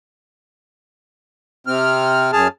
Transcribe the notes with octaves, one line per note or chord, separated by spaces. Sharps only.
C3 C4 F6
F#2 G#4 A5 F6